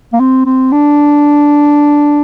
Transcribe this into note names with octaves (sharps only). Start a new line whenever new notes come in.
A#3
C4
C4
D4